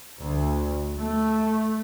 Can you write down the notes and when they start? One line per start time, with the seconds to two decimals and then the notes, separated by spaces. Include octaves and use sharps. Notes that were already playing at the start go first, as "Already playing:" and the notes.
0.22 D2
0.98 A3